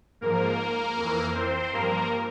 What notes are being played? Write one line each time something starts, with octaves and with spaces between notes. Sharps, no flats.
G#2 F3 A#3 A#4
F2 E3
C4 C5
G2 F3 A#3 A#4